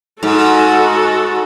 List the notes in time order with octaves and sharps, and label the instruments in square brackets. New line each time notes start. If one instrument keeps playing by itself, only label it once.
[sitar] G#2 [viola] F#4 A4